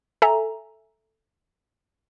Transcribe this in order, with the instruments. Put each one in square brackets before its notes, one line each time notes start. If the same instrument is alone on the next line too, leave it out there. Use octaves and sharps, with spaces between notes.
[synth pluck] A4 E5 G#5 A#5